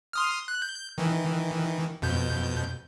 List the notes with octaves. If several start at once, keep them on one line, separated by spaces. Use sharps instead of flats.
C6 D#6 F6
F#6
G6
D#3 E3
F2 B2 G6